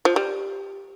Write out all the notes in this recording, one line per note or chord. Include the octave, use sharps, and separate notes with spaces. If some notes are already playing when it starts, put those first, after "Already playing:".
F3
G3